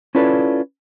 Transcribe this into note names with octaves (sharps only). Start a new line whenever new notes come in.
C#4 E4 F4 A4 B4 D5